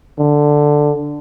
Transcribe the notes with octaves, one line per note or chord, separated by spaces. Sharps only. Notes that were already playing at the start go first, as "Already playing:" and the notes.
D3